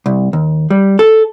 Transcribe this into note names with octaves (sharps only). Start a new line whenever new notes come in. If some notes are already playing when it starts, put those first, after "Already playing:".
C2
D#2
G3
A4